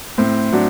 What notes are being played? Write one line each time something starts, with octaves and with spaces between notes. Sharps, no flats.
A2 C4
F#3 D4